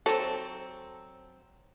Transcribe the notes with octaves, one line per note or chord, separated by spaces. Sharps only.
F#3 C4 A4